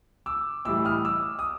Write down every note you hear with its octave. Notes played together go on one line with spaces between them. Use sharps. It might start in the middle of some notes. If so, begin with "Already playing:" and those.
D6 E6
A2 E3 G3 D6 E6
D#6 F6
D6 E6
D#6